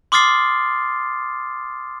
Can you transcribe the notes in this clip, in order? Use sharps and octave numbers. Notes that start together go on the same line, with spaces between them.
C6 D6 D#6 F6 A6 C7